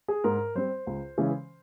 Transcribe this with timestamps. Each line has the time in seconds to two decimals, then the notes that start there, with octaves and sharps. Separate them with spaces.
0.08 G#4
0.24 G#2 A#4
0.55 G3 C4 C5
0.87 C#2
1.18 C#3 E3 G#3 C#4